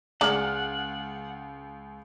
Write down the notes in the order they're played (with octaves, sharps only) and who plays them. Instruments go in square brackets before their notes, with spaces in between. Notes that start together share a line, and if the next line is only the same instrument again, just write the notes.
[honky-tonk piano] C#2 F6 [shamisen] G#3 D5 A#5 [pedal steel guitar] F#5